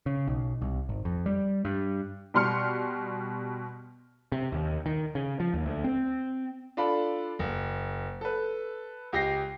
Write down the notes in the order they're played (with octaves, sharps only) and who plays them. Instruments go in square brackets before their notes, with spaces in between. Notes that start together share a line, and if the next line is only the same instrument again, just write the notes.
[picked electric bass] C#3
B1
C2
G#1
F2
G3
G2
[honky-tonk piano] B2 G3 C6 F6 C#7
[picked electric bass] C3
D#2
D#3
C#3
F3
D#2
D2
C4
[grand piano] D4 F4 A4 B5
F#1
A4 B4
C#2 G4 A#6 C7